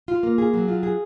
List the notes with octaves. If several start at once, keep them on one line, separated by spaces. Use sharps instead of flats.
F4
A#3
G#4
F#3
F4
G#4